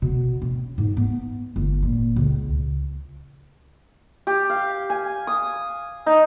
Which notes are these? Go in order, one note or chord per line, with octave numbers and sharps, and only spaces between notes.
B2
C#4
G#2
B3
G1
A#2
C#2
G4
F5
G#5
D#6
D#4